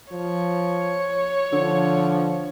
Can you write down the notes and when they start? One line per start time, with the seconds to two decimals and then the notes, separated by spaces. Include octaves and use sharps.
0.13 F3 C#5
1.53 D3 F3